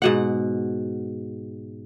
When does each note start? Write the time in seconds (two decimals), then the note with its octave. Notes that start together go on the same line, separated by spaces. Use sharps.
0.02 G#2 B2 F#5